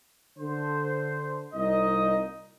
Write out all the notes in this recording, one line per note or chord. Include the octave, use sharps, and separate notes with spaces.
D3 C5
C2 A#2 D#4 D#5